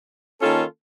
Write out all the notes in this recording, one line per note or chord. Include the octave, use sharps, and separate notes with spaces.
D#3 A#3 C#4 F4 A4